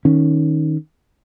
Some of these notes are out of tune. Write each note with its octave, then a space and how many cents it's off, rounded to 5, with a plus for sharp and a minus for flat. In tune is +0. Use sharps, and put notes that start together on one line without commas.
D#3 +0 C#4 +0